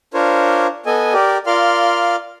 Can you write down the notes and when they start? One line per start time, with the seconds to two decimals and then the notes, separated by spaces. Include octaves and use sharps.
0.14 D4 F4 A#4 C5 C#5
0.86 B3 A4 D#5 G#5
1.13 G4 A#4 D5
1.47 F4 A#4 D5 F5 C6 F6